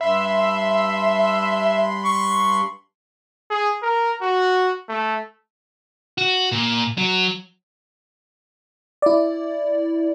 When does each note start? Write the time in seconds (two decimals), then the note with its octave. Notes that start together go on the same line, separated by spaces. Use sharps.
0.01 G2 E5 B5 C6
2.05 C#6
3.51 G#4
3.83 A#4
4.22 F#4
4.89 A3
6.18 F#4
6.52 A#2
6.98 F#3
9.02 E4 D5